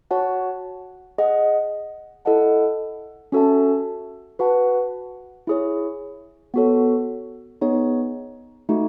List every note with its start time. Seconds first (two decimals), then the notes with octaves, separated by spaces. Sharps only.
0.11 F#4 C#5 F#5 A5
1.18 G#4 D#5 F#5
2.25 E4 A4 D#5 F#5 A5
3.32 C#4 F#4 A4 E5 A5
4.39 F#4 B4 F#5 A5
5.47 E4 G#4 C#5
6.54 B3 F#4 A4 C#5
7.61 B3 D#4 G#4 C#5
8.69 A3 D#4 F#4